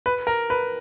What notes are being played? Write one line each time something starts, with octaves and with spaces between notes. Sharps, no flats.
B4
A#4
B4